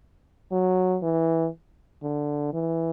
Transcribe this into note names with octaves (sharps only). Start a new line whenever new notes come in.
F#3
E3
D3
E3